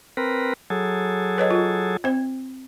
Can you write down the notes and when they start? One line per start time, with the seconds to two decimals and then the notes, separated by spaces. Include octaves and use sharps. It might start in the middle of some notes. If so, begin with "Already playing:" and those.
0.17 C4 A#4 B4
0.70 F#3 G#4 A4
1.38 B4 C#5 D#5
1.51 F4
2.04 C4 C5